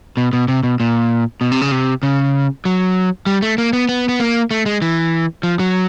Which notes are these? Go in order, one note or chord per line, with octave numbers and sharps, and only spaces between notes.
B2
B2
C3
B2
A#2
B2
C3
C#3
C3
C#3
F#3
G3
A3
A#3
B3
B3
B3
A#3
A3
G#3
E3
F3
F#3